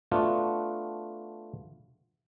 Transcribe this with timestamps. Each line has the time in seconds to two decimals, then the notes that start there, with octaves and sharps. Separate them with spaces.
0.11 A3 B3 D4 F4 F#4